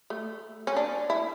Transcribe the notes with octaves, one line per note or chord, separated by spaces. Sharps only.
A3
C#4
D4
E4